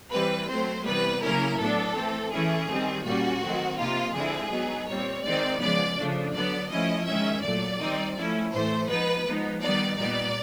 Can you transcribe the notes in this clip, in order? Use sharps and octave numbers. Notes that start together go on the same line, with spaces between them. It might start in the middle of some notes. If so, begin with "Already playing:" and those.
E3 G3 C4 B4
F#3 A3 C4 C5
C3 E3 G3 B3 B4
C#3 F#3 A#3 C#4 E4 A#4
A2 F#3 B3 D4 A4
E3 A3 C4
E3 A3 C#4 E4 G#4
D#3 G3 C4
A#2 G3 A#3 C#4 F#4
D#3 F#3 A3 C4
C3 F3 A#3 D#4 F4
D3 F3 G#3 C4 E4 G#4
F#3 B3 D#4
A#2 G3 C4 C#5
D#3 G#3 C4 D#4 D5
C#3 F3 G#3 B3 D5
C#3 F3 A3 D4
D3 F#3 B3 D5
F3 A3 C#4 E4 D#5
D#3 G#3 C#4 E5
A#2 F#3 A3 D5
D#3 G3 C4 D#4
F3 A3 C#4 E4
A2 E3 A3 C5
F3 G#3 B3 D#4 B4
F3 G#3 B3 D#4
D#3 G3 B3 D#4 D5
A#2 G3 B3 D#4 D5